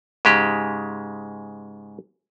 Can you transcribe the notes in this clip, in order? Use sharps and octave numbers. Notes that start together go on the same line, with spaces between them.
G#2 C#3 G#3 G4